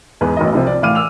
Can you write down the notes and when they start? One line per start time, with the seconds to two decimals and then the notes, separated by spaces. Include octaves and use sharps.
0.21 E2 G#2 G#3 B4
0.37 A1 F#2 D#5
0.53 C2 C3 F3
0.67 D5
0.82 A2 E3 F5 D6 F6 D#7
0.95 D6 E6 F7